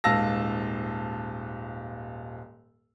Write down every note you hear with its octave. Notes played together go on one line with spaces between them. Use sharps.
D#1 G#2 F5 A5 E6 A#6